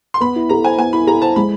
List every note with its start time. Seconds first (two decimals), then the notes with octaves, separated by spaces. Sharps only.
0.14 C6
0.21 B3 B5
0.36 E4
0.49 A4 A#5
0.64 C5 G#5
0.78 B3 G#5
0.93 E4 B5
1.07 A4 A#5
1.22 C5 A5
1.36 G#3 B5